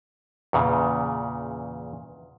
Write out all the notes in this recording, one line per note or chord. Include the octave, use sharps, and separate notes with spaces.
E2 A#2 C#3